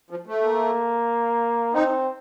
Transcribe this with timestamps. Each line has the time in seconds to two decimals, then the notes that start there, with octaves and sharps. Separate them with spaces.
0.10 F3
0.27 A3
0.43 A#3
1.74 C4 D#4